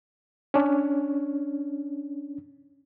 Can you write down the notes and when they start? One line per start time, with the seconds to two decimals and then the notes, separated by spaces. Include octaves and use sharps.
0.54 C#4 D4